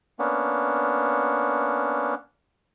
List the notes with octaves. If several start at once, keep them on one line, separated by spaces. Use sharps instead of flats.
A#3 B3 C#4 D4